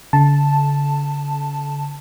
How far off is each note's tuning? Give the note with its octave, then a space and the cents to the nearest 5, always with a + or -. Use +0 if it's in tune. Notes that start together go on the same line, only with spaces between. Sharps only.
D3 -45 A5 +0